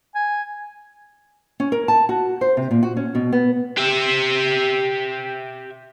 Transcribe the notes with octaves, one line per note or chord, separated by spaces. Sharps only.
G#5
C#4
A#4
A5
F#4
C5
C3
A#2
F#4
C#4
B2
B3
G4 E5